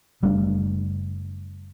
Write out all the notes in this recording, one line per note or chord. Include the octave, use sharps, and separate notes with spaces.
F#1 G3 A3 D4